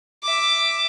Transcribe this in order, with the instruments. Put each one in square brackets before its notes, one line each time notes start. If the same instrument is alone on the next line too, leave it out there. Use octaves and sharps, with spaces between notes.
[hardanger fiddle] E5 D6